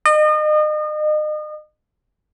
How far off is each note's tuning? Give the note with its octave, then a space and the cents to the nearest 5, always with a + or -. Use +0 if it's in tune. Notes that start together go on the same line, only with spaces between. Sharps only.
D#5 -35